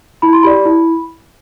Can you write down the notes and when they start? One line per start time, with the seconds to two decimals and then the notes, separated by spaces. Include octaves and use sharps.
0.22 E4 B5
0.33 C6
0.43 G4 D5 B5
0.65 E4